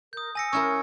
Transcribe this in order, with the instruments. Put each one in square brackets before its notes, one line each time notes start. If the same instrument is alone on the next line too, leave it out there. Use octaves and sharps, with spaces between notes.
[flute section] A#4 [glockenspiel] D#6 G6
[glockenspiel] G#5 A#6 C#7 [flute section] E6
[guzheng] C#4 E4 A#4 [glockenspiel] C#6 G#6 C#7